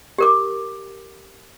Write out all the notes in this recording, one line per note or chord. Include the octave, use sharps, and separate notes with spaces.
G4 A#4 D6